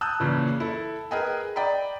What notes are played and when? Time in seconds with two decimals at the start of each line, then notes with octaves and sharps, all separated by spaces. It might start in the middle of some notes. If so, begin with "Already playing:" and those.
0.01 A5 D#6 E6 F#6 G6
0.20 A#2 C#3 E3
0.60 E4 A4
1.11 G#4 A#4 B4 D#5 G5 G#5
1.56 D5 D#5 G5 A#5 B5